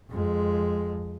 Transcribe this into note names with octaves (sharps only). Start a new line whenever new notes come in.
F2 G#3